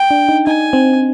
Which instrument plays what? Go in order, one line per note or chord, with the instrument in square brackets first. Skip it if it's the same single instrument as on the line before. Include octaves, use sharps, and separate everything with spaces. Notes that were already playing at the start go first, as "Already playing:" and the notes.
Already playing: [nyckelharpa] G5
[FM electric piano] D4
D#4
[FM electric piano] D#4 [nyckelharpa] G#5
[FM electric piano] C4